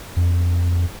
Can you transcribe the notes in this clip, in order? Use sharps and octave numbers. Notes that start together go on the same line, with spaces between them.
F2